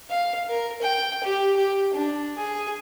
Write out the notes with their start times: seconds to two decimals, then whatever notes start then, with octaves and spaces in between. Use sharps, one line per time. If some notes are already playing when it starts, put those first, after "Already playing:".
0.10 F5
0.49 A#4
0.82 G5
1.24 G4
1.57 G4
1.94 D4
2.37 G#4